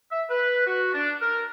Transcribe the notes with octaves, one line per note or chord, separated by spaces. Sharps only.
E5
B4
F#4
D4
A#4